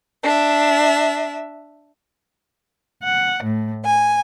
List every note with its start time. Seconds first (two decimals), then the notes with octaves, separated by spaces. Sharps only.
0.23 D4 E5
3.03 F#5
3.44 A2
3.85 G#5